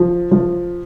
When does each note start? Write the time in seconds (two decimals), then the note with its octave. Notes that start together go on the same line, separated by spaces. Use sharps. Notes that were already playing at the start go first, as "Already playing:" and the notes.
Already playing: F3
0.31 F3